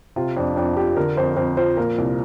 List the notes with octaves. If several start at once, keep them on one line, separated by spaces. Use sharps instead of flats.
C3 F4
F2 D4
F2 D4
F3 G4
D3 A#4
F2 C5
F2 C5
F3 C5
A#2 A#4
C2